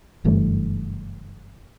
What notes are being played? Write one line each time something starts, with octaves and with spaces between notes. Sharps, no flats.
F#1 G2 E3 A3